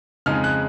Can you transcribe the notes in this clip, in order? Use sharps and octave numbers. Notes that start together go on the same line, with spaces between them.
F2 C#3 G#3 D#4 F6
F#6